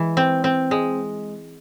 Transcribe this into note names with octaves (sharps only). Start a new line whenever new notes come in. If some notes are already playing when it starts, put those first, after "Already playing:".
Already playing: E3 G#3
C4
C4
G#3